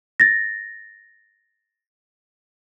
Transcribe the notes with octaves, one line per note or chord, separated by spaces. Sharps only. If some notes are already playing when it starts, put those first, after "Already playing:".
A6 A#6